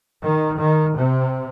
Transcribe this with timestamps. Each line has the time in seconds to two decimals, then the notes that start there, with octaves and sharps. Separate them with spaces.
0.23 D#3
0.59 D#3
0.96 C3